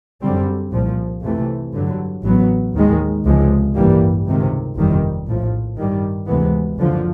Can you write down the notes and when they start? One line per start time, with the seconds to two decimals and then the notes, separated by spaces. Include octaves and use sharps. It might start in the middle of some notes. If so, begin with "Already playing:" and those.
0.22 F#2 D3 G3 C4
0.73 C2 A#2 F3
1.22 F2 C3 E3 A3
1.73 G2 D3 F#3
2.23 A1 A2 F#3 B3
2.74 D#2 D#3 G#3
3.25 C#2 C3 F3 G#3
3.75 A1 G2 E3 G3 A#3
4.26 C#2 C3 D#3
4.76 G1 F2 C3 D#3 G3
5.27 A#1 A2 F3
5.76 G2 D#3 G3
6.27 D2 C3 E3 G#3 B3
6.77 F#1 F#2 D3 F3